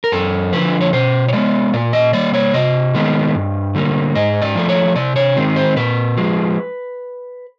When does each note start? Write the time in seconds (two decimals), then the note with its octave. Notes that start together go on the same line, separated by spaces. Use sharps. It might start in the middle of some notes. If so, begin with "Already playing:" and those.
0.04 A#4
0.12 F#2 A4
0.53 D3 F3 B4
0.81 C#5
0.93 B2 C5
1.28 C#5
1.33 G#3 B3 D5
1.73 A#2 D5
1.93 D#5
2.13 G3 A#3 D5
2.34 C#5
2.54 C3 D#5
2.94 D#3 G#3 B3
3.35 G2
3.75 D3 G3 A#3
4.15 G#2 D#5
4.42 D5
4.55 F3 A3
4.69 C#5
4.96 C3 D5
5.16 C#5
5.36 D#3 G#3 C4
5.56 C5
5.76 A#2 B4
6.17 F3 G#3